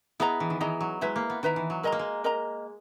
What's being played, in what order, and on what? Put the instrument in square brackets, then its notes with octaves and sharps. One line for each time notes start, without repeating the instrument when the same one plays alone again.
[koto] B3 [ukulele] E4 G#4 D#5 A#5
[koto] E3
D#3
[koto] E3 [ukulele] E4 G#4 D#5 A#5
[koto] F#3
[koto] G#3 [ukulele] E4 B4 E5 A#5
[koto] A#3
B3
[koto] D#3 [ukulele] E4 B4 E5 A#5
[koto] E3
F#3
[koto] G#3 [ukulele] A#4 D#5 A#5
[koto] A#3
G#3
[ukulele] A#4 D#5 A#5